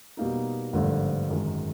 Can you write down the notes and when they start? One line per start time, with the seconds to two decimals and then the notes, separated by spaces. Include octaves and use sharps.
0.17 B2 G3 A#3 D#4
0.73 G#1 G2 D3 F3 A3
1.29 G#1 F#2 D#3 G#3